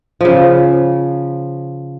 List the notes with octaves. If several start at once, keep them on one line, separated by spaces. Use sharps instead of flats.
C#3 F3